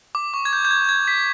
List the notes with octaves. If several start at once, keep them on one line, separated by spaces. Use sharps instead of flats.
D6
C#6
G#6
G6
G6
G#6
G6
G#6
B6